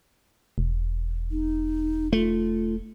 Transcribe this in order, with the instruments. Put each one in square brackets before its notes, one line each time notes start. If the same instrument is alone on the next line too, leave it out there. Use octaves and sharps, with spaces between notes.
[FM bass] E1
[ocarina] D#4
[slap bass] A3 [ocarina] F4